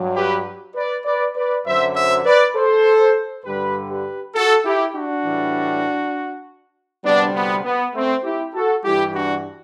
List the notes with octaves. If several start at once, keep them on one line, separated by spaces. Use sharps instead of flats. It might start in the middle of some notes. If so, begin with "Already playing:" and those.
Already playing: G2 F#3
G4 B4
B4 D5
B4 D5
B4 D5
F#2 D3 F#3 C5 E5
C5 E5
B4 D5
A4 C5
G2 D3 G3 G4 B4
G4 B4
F#4 A4
E4 G4
D4 F#4
A2 E3 G3
D2 C3 G3 B3 D4
B3
B3
A3 C4
E4 G4
F#4 A4
G2 E3 G3 E4 G4
D4 F#4